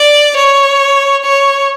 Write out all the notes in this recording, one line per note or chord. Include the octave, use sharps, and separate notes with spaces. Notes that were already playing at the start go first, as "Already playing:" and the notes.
Already playing: D5
C#5
C#5